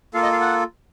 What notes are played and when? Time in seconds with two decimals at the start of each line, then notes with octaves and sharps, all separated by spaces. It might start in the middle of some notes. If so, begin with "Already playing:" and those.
0.14 A#3 F4 A4 F5
0.23 D#5
0.32 F5
0.41 F#5